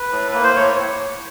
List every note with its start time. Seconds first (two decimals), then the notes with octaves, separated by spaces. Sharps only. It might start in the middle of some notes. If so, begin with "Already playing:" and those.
Already playing: B4
0.12 A2
0.32 A#3 B4
0.44 C5
0.56 A2 C#5